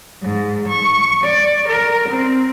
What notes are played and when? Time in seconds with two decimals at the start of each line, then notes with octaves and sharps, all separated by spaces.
0.23 G#2
0.68 C#6
1.24 D5
1.68 A#4
2.09 C4